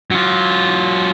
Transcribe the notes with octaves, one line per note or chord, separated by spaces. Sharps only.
F#3 F4